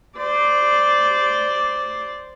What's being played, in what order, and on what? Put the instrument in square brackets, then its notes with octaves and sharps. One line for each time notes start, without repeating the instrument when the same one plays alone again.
[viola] C5 D5